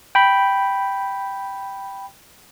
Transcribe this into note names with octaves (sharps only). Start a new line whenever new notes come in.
G5 B5